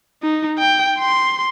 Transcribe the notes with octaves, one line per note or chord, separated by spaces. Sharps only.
D#4
G5
C6